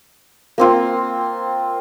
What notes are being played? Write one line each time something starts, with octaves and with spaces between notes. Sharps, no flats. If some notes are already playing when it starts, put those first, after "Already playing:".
A#3 C4 F4